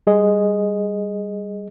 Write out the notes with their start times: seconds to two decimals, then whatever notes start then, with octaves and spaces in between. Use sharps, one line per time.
0.07 G3 G#4 D#5